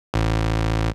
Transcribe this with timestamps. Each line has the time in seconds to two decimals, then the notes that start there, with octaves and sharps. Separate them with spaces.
0.14 A1